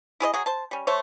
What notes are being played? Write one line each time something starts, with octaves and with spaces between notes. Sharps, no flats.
E4 G#4 C#5 D#5
F#3 F#4 G#4
C5 A5
G3 C#4
A3 C5 C#5